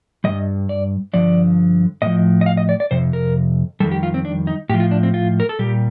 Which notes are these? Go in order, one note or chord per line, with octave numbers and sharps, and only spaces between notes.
G2 D#3 G3 D#5
D5
G2 D3 F3 D5
A2 F3 D#5
D#5
F5
D#5
D5
D5
F2 C3 C5
A#4
F2 D#3 G3 A4
G4
F4
C4
D4
D#4
A2 F3 G4
F4
D4
C4
F4
A#4
A4
A#2 G3 G4